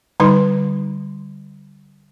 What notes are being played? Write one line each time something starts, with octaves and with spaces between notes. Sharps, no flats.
D3 G3 D#4 B4 C6